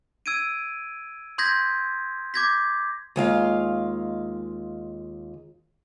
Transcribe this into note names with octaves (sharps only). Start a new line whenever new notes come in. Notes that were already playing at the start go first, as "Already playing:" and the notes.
E6 G#6 D7 D#7
C6 D#6 G6 G#6 A#6 B6
D6 G6 G#6 A#6 B6
D#2 G#3 F4 F5